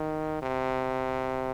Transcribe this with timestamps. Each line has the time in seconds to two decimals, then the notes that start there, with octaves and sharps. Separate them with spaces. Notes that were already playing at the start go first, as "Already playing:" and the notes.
Already playing: D#3
0.42 C3